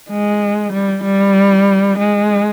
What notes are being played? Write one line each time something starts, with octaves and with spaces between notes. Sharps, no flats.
G#3
G3
G3
G#3